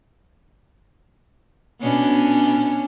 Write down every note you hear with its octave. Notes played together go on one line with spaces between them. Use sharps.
B2 C#4 D4